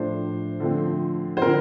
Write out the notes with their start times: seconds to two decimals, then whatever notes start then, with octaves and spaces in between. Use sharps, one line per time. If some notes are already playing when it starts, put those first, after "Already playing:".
Already playing: A2 F3 A3 D4 C5
0.60 D3 F3 A3 C4
1.37 C5
1.42 D3 F3 C4 A#4